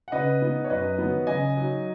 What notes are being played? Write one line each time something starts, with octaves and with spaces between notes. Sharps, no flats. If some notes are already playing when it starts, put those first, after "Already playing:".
F#5
C#3 B4 D#5
B3 D#4
C#5
F#2 B4 D#5
D#3 F#3 B3
C#3 D#5 G#5
F#3 D#4